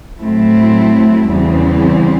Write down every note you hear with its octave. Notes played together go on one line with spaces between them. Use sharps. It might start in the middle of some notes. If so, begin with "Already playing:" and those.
A2 F#3 A3 C4 E4
E2 C#3 E3 G3 C4